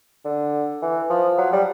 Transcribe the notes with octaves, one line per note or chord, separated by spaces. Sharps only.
D3
E3
F3
F#3
G3